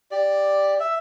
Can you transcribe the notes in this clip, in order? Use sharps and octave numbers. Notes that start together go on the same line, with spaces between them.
G4 D5
E5